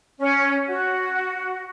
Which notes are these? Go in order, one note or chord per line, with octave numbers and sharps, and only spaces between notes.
C#4
F#4